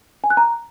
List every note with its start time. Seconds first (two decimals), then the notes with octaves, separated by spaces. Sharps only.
0.24 G#5
0.30 F#6
0.37 A#5